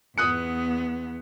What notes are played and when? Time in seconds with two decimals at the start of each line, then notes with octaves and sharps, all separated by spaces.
0.18 E2 B3 D#6 F#6 C#7